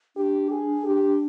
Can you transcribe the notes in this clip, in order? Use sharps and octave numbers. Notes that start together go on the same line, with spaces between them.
D4 G4
G#4
G4